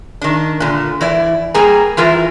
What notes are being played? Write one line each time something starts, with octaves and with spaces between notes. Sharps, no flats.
D#3 D4
A#2 D3
E3 E4 D5
G3 A#3 G#4 G#5 A#5
E3 E4 F4 A#4